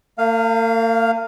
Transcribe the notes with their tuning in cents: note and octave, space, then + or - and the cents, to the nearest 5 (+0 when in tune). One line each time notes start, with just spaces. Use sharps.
A#3 -45 F5 +0